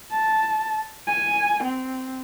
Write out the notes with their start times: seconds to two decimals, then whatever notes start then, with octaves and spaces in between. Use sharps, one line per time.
0.12 A5
1.07 G#5
1.63 C4